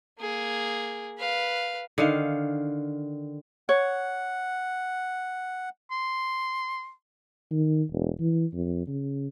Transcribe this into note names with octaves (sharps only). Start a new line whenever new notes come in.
A#3 G#4
B4 F5
D3 D#3 F5
C#5 F#5
C6
D#3
E1
E3
F2
C#3